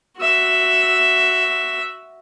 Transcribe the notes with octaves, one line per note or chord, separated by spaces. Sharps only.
F#4 E5